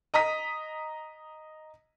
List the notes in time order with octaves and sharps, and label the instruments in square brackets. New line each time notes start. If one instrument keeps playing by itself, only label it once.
[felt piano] D#5 A#5 D#6 B6